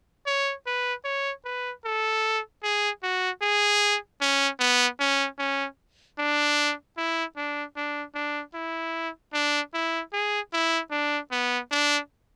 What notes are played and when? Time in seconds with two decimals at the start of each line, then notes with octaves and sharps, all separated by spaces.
0.26 C#5
0.66 B4
1.05 C#5
1.45 B4
1.85 A4
2.63 G#4
3.03 F#4
3.42 G#4
4.21 C#4
4.60 B3
5.00 C#4
5.39 C#4
6.18 D4
6.97 E4
7.36 D4
7.76 D4
8.15 D4
8.54 E4
9.33 D4
9.74 E4
10.13 G#4
10.53 E4
10.91 D4
11.32 B3
11.71 D4